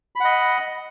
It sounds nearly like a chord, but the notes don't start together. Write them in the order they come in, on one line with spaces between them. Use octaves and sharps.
B5 F#5 D#5